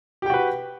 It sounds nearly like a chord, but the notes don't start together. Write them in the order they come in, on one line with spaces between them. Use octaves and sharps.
G4 G5 F#4 B4